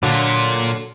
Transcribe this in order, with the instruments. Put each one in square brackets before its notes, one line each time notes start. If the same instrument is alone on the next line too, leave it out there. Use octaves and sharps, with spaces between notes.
[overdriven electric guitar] A#2 F4 [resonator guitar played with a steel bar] D3 F#3